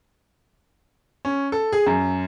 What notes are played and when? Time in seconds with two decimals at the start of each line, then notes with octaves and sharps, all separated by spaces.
1.25 C#4
1.52 A4
1.72 G#4
1.86 F#2